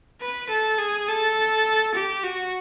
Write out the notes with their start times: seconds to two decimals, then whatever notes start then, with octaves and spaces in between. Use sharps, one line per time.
0.21 B4
0.49 A4
0.79 G#4
1.08 A4
1.95 G4
2.24 F#4